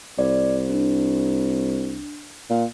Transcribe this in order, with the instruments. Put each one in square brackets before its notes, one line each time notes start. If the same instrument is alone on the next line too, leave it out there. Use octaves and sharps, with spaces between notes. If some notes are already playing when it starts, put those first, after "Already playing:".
[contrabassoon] C2 [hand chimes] D5
[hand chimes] D4
[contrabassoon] A#2